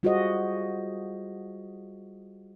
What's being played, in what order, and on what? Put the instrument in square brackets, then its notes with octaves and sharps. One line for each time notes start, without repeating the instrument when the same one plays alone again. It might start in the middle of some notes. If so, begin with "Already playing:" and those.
[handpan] G3 F4 F#4 G#4 C5 D#5